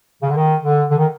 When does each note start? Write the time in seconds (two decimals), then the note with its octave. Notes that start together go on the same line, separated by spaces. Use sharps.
0.22 C#3
0.29 D3
0.36 D#3
0.64 D3
0.90 D3
0.98 D#3